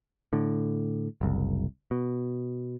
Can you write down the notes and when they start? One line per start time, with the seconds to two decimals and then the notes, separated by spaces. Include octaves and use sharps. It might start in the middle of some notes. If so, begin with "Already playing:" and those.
0.33 A2 D3
1.21 F#1 C2
1.91 B2